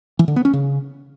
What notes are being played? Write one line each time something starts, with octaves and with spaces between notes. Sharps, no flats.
E3
D3
B3
C#4
C#3